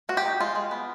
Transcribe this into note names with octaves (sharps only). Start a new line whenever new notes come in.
F3 F#4
G4
D#4
G#3 F4
G#3
B3